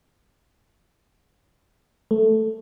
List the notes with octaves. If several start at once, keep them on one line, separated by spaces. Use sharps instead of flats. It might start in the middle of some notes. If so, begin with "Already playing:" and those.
A3